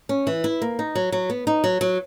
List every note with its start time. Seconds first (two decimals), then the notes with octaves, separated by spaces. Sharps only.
0.09 C#4
0.27 E3
0.44 E4
0.62 A#3
0.79 D#4
0.95 F#3
1.12 F#3
1.30 B3
1.47 D#4
1.64 F#3
1.81 F#3